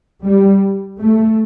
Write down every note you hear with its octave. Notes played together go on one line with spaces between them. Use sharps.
G3
A3